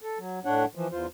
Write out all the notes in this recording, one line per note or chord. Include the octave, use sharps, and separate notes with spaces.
A4
F#3
A2 D4 C#5 F#5
E3 F3
E2 F4 C5